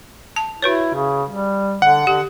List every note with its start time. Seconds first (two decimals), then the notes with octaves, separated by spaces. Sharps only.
0.36 A5
0.62 E4 F#4 B4 C#5
0.94 C#3
1.29 G3
1.82 D3 F#5
2.07 D3 G4